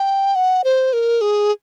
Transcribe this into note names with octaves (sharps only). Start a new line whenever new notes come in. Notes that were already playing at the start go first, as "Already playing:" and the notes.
Already playing: G5
F#5
C5
A#4
G#4